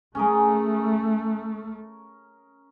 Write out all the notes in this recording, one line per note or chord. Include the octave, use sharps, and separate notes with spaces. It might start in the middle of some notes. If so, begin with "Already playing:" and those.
A3 C#4 G#4 A#4